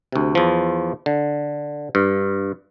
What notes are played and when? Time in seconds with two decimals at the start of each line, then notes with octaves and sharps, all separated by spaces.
0.12 D2 C3
0.35 E2 F3
1.06 D3
1.95 G2